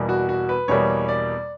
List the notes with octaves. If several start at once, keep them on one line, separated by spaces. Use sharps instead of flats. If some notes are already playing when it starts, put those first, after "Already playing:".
Already playing: E2 B2 G3 A#3
F#4
F#4
B4
E2 B2 G3 A#3 C#5
D5